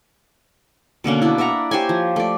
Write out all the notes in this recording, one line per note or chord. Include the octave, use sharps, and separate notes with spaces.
B2 D3 A#3 C#4
D4 E4
D5 E5 F#5 A#5
G4 C5 C#5 G#5
F3
A3 D5